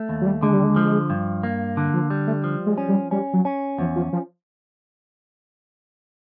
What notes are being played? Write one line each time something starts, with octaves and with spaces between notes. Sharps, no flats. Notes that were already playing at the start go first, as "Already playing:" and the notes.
Already playing: A3
D#2
F#3
G3
D3 G#3
G3
G#3
F3
G2
A#3
D3
F3
G3
A3
F3
G#3
C#4
G3
G3 C#4
F#3
C#4
E2 F3
F3
F3